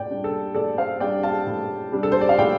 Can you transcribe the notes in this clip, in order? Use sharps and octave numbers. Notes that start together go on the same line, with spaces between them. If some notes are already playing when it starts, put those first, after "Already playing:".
Already playing: A2 D5 G5
G3 D4
A4
A2 A4 D5
C5 F5
G3 D4 D5 G5
F5 A5
A2
G3 D4
A4
C5
D5
F5
A2 D5 G5